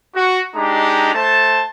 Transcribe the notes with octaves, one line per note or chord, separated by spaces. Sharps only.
F#4
G#3 D4 D#4 G4 A#5
A3 C5 A5